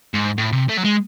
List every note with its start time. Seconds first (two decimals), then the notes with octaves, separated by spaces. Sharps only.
0.14 G#2
0.38 A2
0.52 C3
0.69 A3
0.77 F#3
0.85 G#3